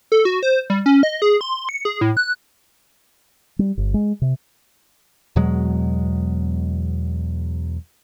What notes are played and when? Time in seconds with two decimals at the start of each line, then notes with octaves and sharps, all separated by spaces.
0.12 A4
0.25 F#4
0.43 C5
0.70 G3
0.86 C#4
1.03 D#5
1.22 G#4
1.41 C6
1.69 C#7
1.85 G#4
2.01 A2
2.17 F#6
3.59 G3
3.77 G1
3.94 G#3
4.22 C3
5.36 E2 B2 F#3 G#3